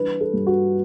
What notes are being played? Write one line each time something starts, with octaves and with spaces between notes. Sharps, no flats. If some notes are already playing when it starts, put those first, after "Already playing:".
Already playing: E3 G3 D4 B4
A4
G2
F#4